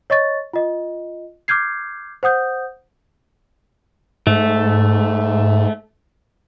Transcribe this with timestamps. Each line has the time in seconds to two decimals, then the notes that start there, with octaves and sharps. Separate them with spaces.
0.10 C#5 D#5 C#6 A6
0.53 F4 D#5
1.48 D6 F6 G6 G#6 C7
2.23 C5 F#5 D#6 G6
4.27 G#2 A3